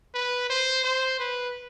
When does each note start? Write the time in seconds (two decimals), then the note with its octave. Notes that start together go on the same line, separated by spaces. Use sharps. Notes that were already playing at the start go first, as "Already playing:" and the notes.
0.15 B4
0.50 C5
0.84 C5
1.19 B4